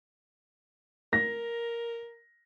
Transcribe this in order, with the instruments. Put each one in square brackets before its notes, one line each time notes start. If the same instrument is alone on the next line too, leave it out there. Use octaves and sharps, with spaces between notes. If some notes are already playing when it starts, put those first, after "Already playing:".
[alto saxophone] A#4 [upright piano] A#6